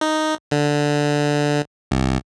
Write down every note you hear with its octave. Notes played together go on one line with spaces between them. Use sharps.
D#4
D3
C2